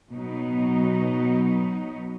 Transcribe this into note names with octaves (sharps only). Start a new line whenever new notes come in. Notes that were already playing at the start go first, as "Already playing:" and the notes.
B2 F#3 B3 D#4